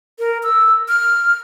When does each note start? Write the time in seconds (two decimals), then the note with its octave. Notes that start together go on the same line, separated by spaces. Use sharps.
0.19 A#4
0.43 E6
0.88 F6